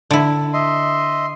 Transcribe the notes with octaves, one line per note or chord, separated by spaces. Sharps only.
D3 E4
D#5 E5 C6